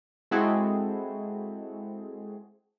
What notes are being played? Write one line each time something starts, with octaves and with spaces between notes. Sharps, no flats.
G#3 C4 E4 F#4 G#4 A4